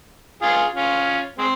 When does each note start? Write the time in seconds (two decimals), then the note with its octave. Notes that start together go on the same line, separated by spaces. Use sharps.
0.42 F4 G#4
0.75 C#4 F4
1.38 G#3 C4